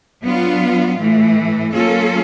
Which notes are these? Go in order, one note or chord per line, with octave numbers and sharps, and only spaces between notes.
F#3 B3 D4 F4
A2 E3 A3
F#3 A#3 C#4 F4 A4